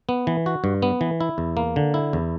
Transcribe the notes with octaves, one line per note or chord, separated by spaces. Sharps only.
B3
E3
F#4
G2
B3
E3
E4
E2
A#3
D3
E4
E2